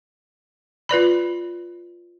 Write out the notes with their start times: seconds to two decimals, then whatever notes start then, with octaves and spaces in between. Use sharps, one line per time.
0.89 F4 B4 D5 B5